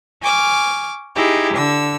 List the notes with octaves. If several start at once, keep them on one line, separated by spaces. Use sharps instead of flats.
G#5 C#6 D6 F6
D#4 E4 G4 G#4
D3 E6